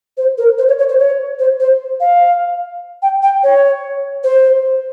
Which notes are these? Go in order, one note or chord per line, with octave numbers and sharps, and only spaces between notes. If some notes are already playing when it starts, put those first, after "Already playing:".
C5
A#4
C5
C#5
C#5
C5
C#5
C5
C5
F5
G5
G5
C#5
C5